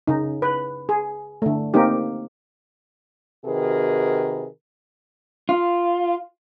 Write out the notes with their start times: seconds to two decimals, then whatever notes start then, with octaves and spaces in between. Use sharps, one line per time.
0.08 C#3 D#4
0.42 B4
0.89 G#4
1.42 D3 A3
1.74 A#3 C4 D#4 G4
3.45 C3 D#3 F#4 G#4 A#4 B4
5.49 F4